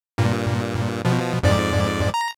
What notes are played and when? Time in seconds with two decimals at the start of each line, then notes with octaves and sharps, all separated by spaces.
0.18 G2 A#2
1.05 B2 F3
1.43 F2 G#2 D5
2.14 A#5